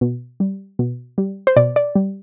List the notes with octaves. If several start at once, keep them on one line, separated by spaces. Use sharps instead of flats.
B2
G3
B2
G3
C5
B2 D5
D5
G3